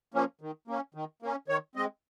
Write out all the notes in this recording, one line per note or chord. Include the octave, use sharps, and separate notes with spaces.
F3 A#3 C#4
D#3
A#3 C#4
D#3
A#3 C#4
D#3 C#5
G#3 C4 D#5